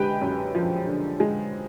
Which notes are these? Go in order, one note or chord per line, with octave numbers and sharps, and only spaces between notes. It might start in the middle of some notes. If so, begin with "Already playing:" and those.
Already playing: D3 G#3 G4 B4 G5 B5
F#2
F3
D3
G#3